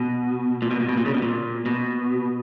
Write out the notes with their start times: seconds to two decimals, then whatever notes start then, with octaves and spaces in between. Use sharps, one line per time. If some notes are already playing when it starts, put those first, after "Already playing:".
Already playing: B2
0.62 A#2
0.71 B2
0.80 A#2
0.89 B2
0.97 A#2
1.06 C#3
1.14 B2
1.22 A#2
1.66 B2